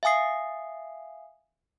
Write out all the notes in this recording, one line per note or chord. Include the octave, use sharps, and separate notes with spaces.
E5 F5 G#5 D#6 C7